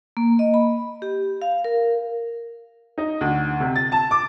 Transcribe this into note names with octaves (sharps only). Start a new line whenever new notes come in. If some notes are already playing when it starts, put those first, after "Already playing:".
A#3
D#5
B5
G4
F5
A#4
D#4
D2
C3
A6
A5
D6